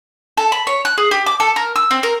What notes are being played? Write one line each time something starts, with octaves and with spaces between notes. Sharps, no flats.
A4
B5
C#5
F#6
G#4
G4
D6
A4
A#4
E6
C4
A#4